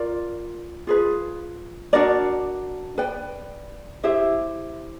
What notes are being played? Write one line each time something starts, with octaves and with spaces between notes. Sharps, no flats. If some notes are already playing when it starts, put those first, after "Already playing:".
Already playing: F4 A#4 D5
F4 G#4 B4
D4 F#4 A#4 D5
B4 D5 G5
E4 G4 C5 E5